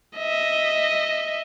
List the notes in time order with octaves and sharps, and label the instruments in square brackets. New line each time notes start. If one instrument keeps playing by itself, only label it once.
[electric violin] D#5 E5